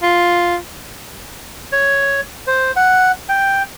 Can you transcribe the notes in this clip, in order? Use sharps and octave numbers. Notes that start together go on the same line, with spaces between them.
F4
C#5
C5
F#5
G5